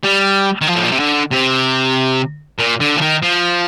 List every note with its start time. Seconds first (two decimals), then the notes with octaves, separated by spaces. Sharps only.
0.03 G3
0.61 D#3
0.67 F3
0.75 A2
0.83 A#2
0.91 C3
0.99 D3
1.31 C3
2.59 A#2
2.80 D3
2.96 F3
3.01 D#3
3.23 F3